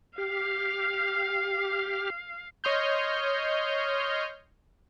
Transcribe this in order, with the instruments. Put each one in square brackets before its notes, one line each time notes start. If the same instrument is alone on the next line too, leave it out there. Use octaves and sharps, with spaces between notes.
[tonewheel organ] G4 F6 [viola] F5
[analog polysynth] C#5 D#5 C6 F6 G6